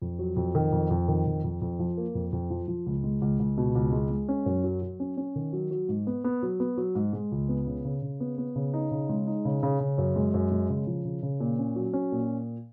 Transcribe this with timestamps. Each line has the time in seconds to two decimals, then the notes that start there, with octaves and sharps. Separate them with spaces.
0.02 F2
0.19 F#3
0.36 F2
0.55 D#3
0.72 F2
0.91 F2
1.08 D#3
1.26 F2
1.44 F2
1.62 F2
1.79 F3
1.97 A#3
2.15 F2
2.33 F2
2.50 F3
2.68 F3
2.86 C#2
3.04 G#3
3.22 C#2
3.39 C#2
3.57 B2
3.75 C#2
3.93 G#3
4.11 G#3
4.29 C#4
4.46 F#2
4.64 F#3
4.82 F#3
5.00 C#4
5.17 C#4
5.36 D#3
5.53 F#3
5.71 F#3
5.89 G#2
6.07 B3
6.24 B3
6.43 F#3
6.60 B3
6.77 F#3
6.95 G#2
7.13 G#3
7.32 C#2
7.49 B3
7.67 C#3
7.84 C#3
8.02 C#3
8.20 B3
8.38 B3
8.56 C#3
8.74 D#4
8.91 C#3
9.09 G#3
9.27 D#4
9.45 C#3
9.63 C#3
9.80 C#3
9.98 F#2
10.16 G#3
10.34 F#2
10.52 G#3
10.69 C#3
10.87 F3
11.05 C#3
11.23 C#3
11.40 A#2
11.59 C#4
11.76 F#3
11.93 C#4
12.12 A#2